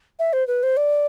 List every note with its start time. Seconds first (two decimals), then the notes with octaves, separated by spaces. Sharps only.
0.19 E5
0.33 C5
0.47 B4
0.63 C5
0.77 D5